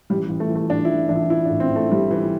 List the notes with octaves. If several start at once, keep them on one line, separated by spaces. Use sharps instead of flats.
A1 G3
A1
A3
E3
A3
A2 D4
E4
A1
A1 D4
E4
E3 E4
D4
A2
C4
A1
A3
A1 G3
E3